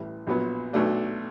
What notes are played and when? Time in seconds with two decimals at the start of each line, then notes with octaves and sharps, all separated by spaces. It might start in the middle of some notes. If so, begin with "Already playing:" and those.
Already playing: A1 A2 E3 G3
0.27 A#1 A#2 F#3 B3
0.73 B1 B2 F#3 A3 D4